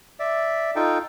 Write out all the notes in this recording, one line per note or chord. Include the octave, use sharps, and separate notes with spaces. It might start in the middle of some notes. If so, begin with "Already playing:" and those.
D5 E5
D#4 F4 A4 G5